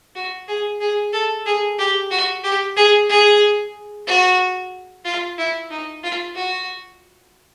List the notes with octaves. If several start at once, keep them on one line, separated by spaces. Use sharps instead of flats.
F#4
G#4
G#4
A4
G#4
G4
F#4
G4
G#4
G#4
F#4
F4
E4
D#4
F4
F#4